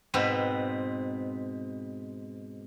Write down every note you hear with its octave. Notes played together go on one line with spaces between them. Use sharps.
G#2 B2 C4 B4